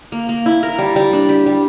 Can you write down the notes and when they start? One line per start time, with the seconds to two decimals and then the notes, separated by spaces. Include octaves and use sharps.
0.12 A#3
0.29 A#3
0.46 E4
0.63 A#4
0.79 G3
0.96 G3
1.13 D4
1.29 G4
1.46 G3